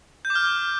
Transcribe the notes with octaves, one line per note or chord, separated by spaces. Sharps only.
G6
D6
F6